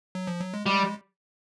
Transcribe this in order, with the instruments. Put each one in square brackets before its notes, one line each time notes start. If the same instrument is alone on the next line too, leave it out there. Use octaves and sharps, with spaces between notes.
[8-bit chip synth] F#3
F3
F#3
G#3
[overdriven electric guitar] G3 [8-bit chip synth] G#3